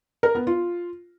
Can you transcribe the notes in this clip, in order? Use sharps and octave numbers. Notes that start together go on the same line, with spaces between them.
A#4
B3
F4